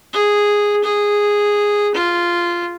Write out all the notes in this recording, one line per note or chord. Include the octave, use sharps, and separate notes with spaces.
G#4
G#4
F4